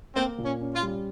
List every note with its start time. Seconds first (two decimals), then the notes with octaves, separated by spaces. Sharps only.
0.15 A#3 C4
0.38 A#2
0.45 C#4
0.60 C#4
0.75 F4
0.82 G3